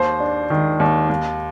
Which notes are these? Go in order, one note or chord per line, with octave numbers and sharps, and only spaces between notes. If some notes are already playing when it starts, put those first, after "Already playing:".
Already playing: D#2 C5
D4
D#3
D#2
D#2